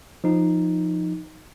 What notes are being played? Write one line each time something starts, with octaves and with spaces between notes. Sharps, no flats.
F3 D#4